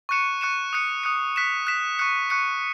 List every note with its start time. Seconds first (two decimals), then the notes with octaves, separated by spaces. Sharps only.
0.09 C#6 F#6 C#7 E7
0.41 C#6 F#6 C#7 E7
0.73 D#6 F#6 C#7
1.04 D#6 F#6 C#7
1.36 F#6 B6 E7
1.67 F#6 B6 E7
1.99 C#6 F#6 C#7
2.30 C#6 F#6 C#7